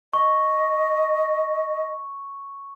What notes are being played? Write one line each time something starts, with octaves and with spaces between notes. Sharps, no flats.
D#5 C#6